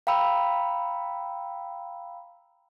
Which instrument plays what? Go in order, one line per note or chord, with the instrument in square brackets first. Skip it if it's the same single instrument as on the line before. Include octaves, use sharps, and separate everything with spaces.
[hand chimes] F5 G5 A#5 B5 E6